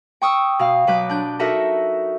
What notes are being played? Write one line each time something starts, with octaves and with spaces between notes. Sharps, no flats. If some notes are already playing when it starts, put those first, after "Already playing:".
G5 C#6 D#6 E6
B2 F5
B2 F#3 B4 D6 G6
D4 G6
D#4 F#4 A4 A#4 E5